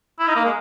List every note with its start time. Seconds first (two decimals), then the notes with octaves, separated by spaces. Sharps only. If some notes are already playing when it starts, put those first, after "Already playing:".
0.19 E4
0.28 D#4
0.36 A#3
0.45 G#3